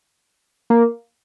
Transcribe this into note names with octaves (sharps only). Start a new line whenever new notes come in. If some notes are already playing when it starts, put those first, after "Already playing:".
A#3